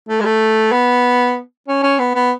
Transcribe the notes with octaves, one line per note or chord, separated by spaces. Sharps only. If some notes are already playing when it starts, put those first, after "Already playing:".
A3
G#3
A3
B3
C#4
C#4
B3
B3